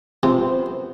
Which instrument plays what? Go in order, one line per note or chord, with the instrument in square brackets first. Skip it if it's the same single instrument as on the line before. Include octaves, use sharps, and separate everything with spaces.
[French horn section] F#2 B3 C5 [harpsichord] C3 [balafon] F4 C6